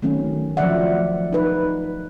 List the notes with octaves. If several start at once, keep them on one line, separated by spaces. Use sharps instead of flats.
D#3 F#3 A3 C4 C#4
F3 F#3 A3 D5 E5 F#5
D#4 B4